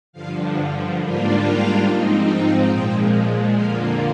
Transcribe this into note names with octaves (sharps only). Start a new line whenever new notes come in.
G2 D3 F3 F5
G#2 G3 A#3 D4 F4
F5
G#2 F3 C4 D#4
G5
A#2 F3 G#3 G5
F2 D3 F3 A#3 F5